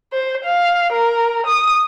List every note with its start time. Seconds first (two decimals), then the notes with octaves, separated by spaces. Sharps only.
0.13 C5
0.44 F5
0.93 A#4
1.46 D#6